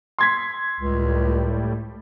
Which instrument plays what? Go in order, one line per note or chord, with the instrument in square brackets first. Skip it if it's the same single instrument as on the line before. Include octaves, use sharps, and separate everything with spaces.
[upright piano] C6 G#6 B6
[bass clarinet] C#2 [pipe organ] A2 G3